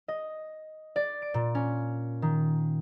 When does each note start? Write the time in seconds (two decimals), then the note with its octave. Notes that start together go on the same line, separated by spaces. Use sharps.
0.08 D#5
0.96 D5
1.22 D7
1.34 A#2
1.55 C#4
2.22 D#3